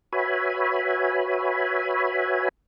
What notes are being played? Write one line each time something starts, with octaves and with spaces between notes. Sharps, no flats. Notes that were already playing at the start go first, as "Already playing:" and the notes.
F#4 B4 C#5 E5 G#5 B5